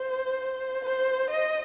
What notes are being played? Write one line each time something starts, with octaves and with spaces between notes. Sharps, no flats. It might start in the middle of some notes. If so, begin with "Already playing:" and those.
Already playing: C5
C5
D#5